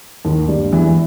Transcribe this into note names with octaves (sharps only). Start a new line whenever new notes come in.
D#2 D#3
G2 G3
E2 E3